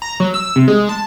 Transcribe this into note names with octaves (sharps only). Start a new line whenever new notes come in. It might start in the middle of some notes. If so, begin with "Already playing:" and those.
A#5
F#3
E6
C3
G#3
A5